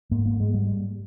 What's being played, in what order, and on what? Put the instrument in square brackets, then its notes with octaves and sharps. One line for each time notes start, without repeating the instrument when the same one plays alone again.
[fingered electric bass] G#2 A#3
A#3
G#3
G3